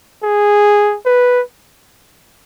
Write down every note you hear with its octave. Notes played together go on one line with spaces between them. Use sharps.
G#4
B4